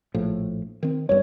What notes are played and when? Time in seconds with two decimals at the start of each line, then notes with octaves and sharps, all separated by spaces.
0.14 A#1 A2 F3
0.83 D#3 C4
1.09 G1 G2 C#5